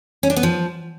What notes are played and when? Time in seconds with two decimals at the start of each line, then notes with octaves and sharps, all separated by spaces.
0.23 C#4
0.30 D4
0.36 B3
0.43 F3